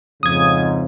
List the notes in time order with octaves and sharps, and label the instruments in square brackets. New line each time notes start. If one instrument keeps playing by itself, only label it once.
[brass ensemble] F2 G#2 C#3 [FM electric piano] D#6 G#6